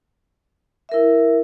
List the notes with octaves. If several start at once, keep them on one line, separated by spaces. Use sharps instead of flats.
E4 A#4 E5